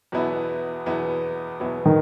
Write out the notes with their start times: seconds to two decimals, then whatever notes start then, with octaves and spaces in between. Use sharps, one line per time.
0.12 E2 B2 F#3 B3 E4
0.86 E2 B2 F#3 B3 E4
1.60 E2 B2 F#3 B3 E4
1.86 D#3